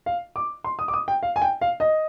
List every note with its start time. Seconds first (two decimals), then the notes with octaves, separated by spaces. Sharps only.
0.06 F5
0.36 D6
0.64 C6
0.79 D#6
0.88 D6
0.94 D#6
1.08 G5
1.23 F5
1.36 G#5
1.42 G5
1.61 F5
1.80 D#5